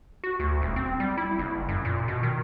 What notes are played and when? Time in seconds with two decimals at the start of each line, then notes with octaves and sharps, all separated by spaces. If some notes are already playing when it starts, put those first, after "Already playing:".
0.24 F#4
0.40 D2
0.62 D#1
0.76 C4
1.00 G3
1.18 E4
1.38 F#1
1.69 F#2
1.85 A#2
2.08 B2
2.23 D#3